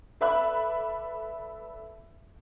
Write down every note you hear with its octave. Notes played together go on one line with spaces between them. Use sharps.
A4 B4 D5 E5 B5 F#6